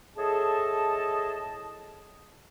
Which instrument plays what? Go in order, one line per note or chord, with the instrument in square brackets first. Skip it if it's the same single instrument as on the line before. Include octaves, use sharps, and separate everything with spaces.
[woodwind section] A2 G#4 A4 D#5 A5